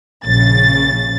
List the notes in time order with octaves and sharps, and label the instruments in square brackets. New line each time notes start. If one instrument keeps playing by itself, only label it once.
[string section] A#1 C#3 A6